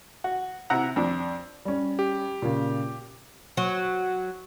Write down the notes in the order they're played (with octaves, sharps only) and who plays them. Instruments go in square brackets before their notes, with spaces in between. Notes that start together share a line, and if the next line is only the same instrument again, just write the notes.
[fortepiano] F#4
C3 E4 F#5 A#5
F2 D4
[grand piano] G3 C#4
[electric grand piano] G4
[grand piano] A#2 C#3
[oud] F#3